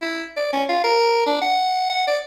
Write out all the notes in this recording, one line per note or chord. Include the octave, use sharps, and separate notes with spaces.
E4
D5
C#4
F4
A#4
D4
F#5
F#5
D5